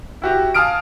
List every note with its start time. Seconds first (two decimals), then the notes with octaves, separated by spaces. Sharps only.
0.22 E4 F#4 G4
0.55 F5 G#5 A5 D#6 F6 D7